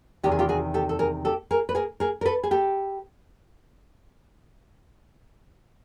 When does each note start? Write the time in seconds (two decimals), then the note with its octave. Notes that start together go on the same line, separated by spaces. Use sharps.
0.23 E2 C3 D#3 G4
0.32 G#4
0.39 F4 G4
0.49 F#4 G#4
0.74 G4 A4
0.89 A4
0.99 G#4 A#4
1.25 G4 A4
1.51 G#4 A#4
1.69 B4
1.75 G#4 A#4
2.00 G#4 A#4
2.21 A#4
2.25 A4 B4
2.43 G#4
2.51 G4 A4